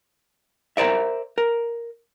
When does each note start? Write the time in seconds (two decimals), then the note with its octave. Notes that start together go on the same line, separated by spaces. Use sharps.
0.77 A#4 C5 D5 E5
1.38 A#4